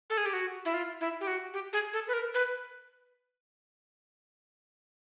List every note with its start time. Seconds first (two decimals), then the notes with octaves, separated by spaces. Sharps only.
0.10 A4
0.18 G#4
0.26 G4
0.33 F#4
0.65 E4
0.74 F4
1.01 E4
1.21 G4
1.27 F#4
1.54 G4
1.73 G#4
1.93 A4
2.08 B4
2.13 A#4
2.34 B4